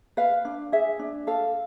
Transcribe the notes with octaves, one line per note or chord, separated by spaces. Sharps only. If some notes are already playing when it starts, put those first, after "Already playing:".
B4 F5
D4
G#4 E5
D4
A4 F5